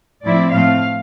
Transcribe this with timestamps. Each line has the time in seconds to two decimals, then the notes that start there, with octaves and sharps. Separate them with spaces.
0.24 A2 F3 C4 E4 D5
0.53 A2 F3 A3 C4 F5